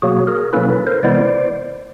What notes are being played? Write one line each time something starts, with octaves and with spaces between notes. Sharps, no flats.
B2 F#3 A#3 F#4 G#4
G#4 A#4
B2 F#3 A#3 C#4 E4 A4 B4
A4 B4
A#4 C5
C3 E3 G#3 B3 E4 C5 D5